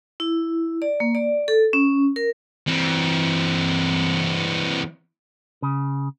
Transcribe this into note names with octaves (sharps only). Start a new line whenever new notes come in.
E4
D5
A#3
D5
A4
C#4
A#4
E3 C4
C#3